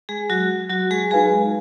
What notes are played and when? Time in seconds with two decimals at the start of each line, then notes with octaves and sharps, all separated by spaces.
0.09 G#3 G#4
0.30 F#3 F#4
0.70 F#3 F#4
0.91 G#3 G#4
1.11 G#3 D#4 F#4 G#4 B4 F5 G#5